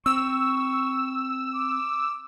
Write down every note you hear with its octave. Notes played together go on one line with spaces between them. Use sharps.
C4 C#6 E6
D6